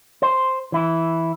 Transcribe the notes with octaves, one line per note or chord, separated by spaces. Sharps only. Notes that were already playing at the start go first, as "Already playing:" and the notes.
C5
E3 E4